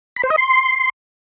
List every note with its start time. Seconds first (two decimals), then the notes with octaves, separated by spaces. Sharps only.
0.16 B5
0.23 C5
0.30 D#5
0.37 C6